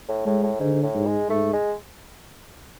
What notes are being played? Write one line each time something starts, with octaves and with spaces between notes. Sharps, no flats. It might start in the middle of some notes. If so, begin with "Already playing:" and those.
A2
A2 G#3
A2
G#2 D3
A2
G#2
G#3
G#2 A3
G#3